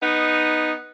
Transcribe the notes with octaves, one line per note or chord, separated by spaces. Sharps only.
B3 D#4